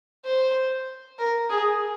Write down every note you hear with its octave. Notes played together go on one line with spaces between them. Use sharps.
C5
A#4
G#4